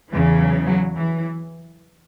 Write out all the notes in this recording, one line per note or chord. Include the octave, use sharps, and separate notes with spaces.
E2 C#3 E3
F#3
F#3
E3